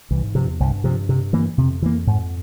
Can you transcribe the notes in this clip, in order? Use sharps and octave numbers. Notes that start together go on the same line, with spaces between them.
C2 E3
G#2
G2 C3 F3
E2
C2 G2
C3 F3
C3
E3 A#3
F2 C3
E3 A#3
G#2